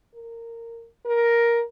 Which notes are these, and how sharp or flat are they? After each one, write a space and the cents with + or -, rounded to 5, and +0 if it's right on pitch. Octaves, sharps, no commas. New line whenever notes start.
A#4 -15
A#4 +10